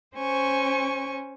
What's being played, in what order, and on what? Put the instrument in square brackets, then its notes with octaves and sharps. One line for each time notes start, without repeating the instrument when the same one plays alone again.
[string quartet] C#4 C5 G#5 C#6